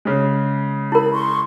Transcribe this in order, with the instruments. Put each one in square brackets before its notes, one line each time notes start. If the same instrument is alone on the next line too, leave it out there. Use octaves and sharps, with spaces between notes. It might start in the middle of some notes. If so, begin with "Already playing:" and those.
[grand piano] C#3 G#3
[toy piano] E4 A#4 [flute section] B5
[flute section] C6 C#6